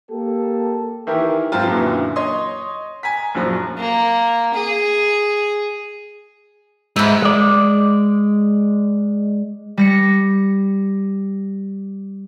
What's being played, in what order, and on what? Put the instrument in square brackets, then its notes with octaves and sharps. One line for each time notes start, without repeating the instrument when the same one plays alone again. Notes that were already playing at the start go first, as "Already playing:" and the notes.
[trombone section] A#3 G4 A4
[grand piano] D#3 E3 E4 G4 A#4
G#2 F3 F#3 C4 F4
F#2 A#2 D3 E3
C#5 D#5 C6 D#6
G#5 A#5 B6
A#1 F#2 F3 F#3
[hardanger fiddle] A#3
G#4
[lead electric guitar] G#2 [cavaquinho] B4 E5
[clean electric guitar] G#3 D5
[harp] G3 A#6 C#7